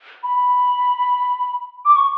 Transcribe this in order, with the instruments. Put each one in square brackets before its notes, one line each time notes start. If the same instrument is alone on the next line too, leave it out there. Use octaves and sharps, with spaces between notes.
[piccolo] B5
D6
C#6